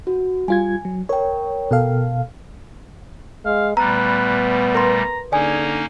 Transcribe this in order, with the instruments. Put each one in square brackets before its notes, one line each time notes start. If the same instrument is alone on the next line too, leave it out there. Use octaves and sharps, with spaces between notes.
[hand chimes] F#4
[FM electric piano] G3 F4 G#6 [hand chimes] G#5
[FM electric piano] F#3
[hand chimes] A#4 G5 [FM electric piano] C#5
[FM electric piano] B2 A4 F5
[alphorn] G#3 [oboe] F5
[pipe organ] A#2 G3 A3 [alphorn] B3 [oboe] B4 [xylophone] A#5
[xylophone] A#4 B4 C6 [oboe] A#5
[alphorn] D3 [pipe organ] A#3 C#4 D#4 [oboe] G#4 [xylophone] D5 G#5